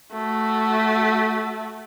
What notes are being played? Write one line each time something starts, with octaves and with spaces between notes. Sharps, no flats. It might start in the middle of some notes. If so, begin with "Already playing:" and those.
A3 F#4